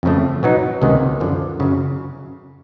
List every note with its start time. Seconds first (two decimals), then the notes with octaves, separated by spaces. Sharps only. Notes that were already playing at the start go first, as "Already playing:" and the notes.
0.03 F2 C#3 F3 A3
0.43 B2 F#3 B3 D#4
0.82 C#2 C3 D#3 G#3 B3
1.20 F#2 D3 F3
1.60 F#2 C#3 F#3